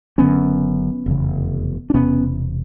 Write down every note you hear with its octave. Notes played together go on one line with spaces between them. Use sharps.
F#1 F#2 D3 B3 C#4
F1 E2 C#3
D4
E1 E2 C3 B3 C#4